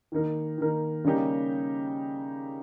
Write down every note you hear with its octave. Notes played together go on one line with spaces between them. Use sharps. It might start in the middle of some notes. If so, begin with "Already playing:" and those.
D#3 A#3 D#4 A#4
D#3 A#3 D#4 A#4
C#3 G3 A#3 D#4 G4